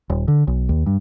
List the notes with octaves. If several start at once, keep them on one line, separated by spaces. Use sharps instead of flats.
D#1
D3
B1
D#2
G2